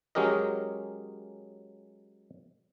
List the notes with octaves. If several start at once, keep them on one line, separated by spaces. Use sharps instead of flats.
F#3 G#3 C#4 G4 A#4 D#5